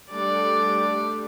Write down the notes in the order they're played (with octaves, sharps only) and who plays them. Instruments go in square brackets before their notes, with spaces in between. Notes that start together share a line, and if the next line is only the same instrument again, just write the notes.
[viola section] G3 A3 D4 [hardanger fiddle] D5